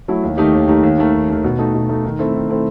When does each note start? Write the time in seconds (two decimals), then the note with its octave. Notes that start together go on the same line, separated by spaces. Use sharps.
0.08 F#3 A3 E4
0.23 D#2
0.37 D#3 A3 D#4 G4
0.53 D#2
0.68 D#3 A3 D#4 G4
0.83 D#2
0.98 D#3 A3
1.13 D#2
1.29 D#3 A3
1.44 B2
1.58 A3 D#4 A4
1.74 B2
1.89 A3 D#4 A4
2.05 D#3
2.19 A3 C4 E4 A4
2.35 D#3
2.49 A3 C4 E4 A4